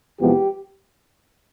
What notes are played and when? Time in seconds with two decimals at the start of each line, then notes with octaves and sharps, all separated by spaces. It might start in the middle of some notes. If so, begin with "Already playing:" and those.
0.19 E2 C3 F3 G#3 B3 G4